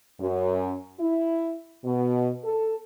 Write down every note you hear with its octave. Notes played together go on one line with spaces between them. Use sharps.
F#2
E4
B2
A4